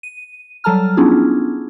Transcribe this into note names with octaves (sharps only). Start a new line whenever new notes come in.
D#7
F#3 G3 A4 A5 A#5 F6
B3 C#4 D4 E4 F4 G#4